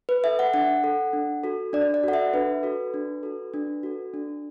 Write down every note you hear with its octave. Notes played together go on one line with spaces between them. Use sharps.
B4
A4 E5
F#5
D4 F#5
A4
D4
F#4 A4
D4 D5
D5
F#4 A4 F#5
E5
D4 B4
F#4 A4
D4
F#4 A4
D4
F#4 A4
D4